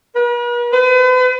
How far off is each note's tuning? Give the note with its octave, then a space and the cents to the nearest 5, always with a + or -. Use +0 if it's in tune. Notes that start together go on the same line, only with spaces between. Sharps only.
B4 -45
B4 +40